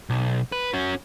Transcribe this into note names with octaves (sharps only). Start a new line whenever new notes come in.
B1
B4
C#4 F#4